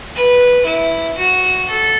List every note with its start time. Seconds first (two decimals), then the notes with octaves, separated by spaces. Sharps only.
0.16 B4
0.66 E4
1.18 F#4
1.69 A4